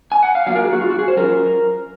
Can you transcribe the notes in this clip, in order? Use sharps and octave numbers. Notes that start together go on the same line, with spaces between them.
G#5
F#5
F5
F#3 A#3 F4 F5
A#4
G#4
F#4
F4
F#4
G#4
C5
F#3 C#4 F4 A#4